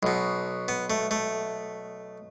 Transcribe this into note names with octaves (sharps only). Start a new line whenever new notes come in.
B1 B2
B3
A3
A3